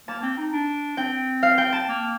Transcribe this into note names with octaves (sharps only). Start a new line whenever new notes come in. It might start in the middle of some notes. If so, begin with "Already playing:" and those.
A#3 A5
C4
D#4
D4
C4 G5
F5
G5
A5
A#3